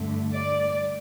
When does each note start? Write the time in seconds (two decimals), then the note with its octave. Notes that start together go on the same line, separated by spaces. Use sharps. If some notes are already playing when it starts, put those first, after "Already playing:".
Already playing: G2 D3 A3
0.34 D5